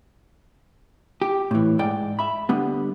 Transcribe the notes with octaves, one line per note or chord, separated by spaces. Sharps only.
G4
A2 E3
G#2 D5 G5
E5 B5
D3 G3 B3 G4